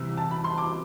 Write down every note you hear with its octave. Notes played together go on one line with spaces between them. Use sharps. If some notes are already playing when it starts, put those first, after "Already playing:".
Already playing: C2 C3 E3 E6
A5
B5
C6
D6